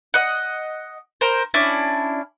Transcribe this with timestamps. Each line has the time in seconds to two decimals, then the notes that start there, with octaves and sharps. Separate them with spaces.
0.14 D#5 F#5
1.21 A#4 C5
1.54 C#4 D4 E4